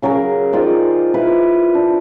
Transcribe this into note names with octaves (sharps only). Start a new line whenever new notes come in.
C#3 F#3 G#4 A#4
D#3 F4 C5 D5
E4 F4 B4
D4